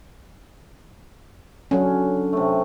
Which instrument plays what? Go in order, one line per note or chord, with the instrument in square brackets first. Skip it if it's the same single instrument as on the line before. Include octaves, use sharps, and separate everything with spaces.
[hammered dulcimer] D3 [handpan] F#3 C#4
[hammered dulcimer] C3 A3